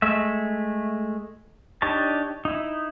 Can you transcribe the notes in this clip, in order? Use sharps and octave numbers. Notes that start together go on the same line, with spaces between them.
G#3 A3 E5
D4 D#4 G4 C#5 A5
D#4 E4